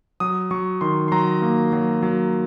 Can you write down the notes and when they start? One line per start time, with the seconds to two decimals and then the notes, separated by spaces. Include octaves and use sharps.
0.20 F#3 D#6
0.51 F#3 C#6
0.81 D#3 C6
1.08 C6
1.12 F#3 A#5
1.42 A#3
1.73 F#3
2.03 F#3